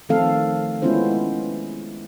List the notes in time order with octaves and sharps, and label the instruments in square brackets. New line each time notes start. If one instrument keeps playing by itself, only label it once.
[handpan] D#3 F3 A3 C4 A4 F5
G#3 B3 C#4 E4 F4 C5